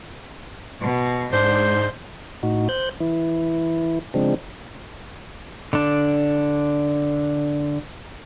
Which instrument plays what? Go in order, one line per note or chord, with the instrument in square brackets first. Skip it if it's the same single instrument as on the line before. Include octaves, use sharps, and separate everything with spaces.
[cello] B2
[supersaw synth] G#2 G6 [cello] D4 [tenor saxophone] C5
[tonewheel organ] A2 D#4 F#4
C5 F#6 G6
E3 E4
C#3 F3 G#3 C4 D4
[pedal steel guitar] D3 D4